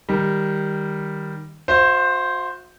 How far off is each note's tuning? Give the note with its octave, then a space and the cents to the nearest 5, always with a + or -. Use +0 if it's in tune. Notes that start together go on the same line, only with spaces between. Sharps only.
D#3 +0 G3 +0
F#4 -40 C5 +0 E5 +15